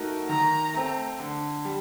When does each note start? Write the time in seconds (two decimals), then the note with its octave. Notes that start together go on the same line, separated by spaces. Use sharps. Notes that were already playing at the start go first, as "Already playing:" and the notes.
Already playing: A3 D#4 F#4 A#4
0.29 D#3 A#5
0.74 A3 C4
1.19 D3
1.65 G3